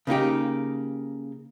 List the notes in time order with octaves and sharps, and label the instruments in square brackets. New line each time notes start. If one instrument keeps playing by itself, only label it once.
[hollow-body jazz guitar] C#3 A#3 D#4 G4